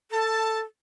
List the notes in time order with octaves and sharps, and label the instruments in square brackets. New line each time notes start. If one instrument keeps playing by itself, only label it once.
[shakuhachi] A4 [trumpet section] A5